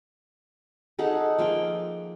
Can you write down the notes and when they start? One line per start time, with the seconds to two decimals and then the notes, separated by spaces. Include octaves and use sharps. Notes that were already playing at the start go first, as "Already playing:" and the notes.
0.99 D#4 G#4 A4 F#5
1.38 F3 A#3 G#4 G5